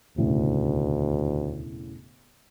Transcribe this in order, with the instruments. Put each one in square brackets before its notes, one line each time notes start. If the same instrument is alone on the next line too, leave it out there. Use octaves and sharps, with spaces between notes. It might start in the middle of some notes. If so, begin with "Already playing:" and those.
[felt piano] E1 A2 C#3 [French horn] D2